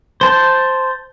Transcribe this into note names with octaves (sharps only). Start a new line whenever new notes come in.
C5 A5 G6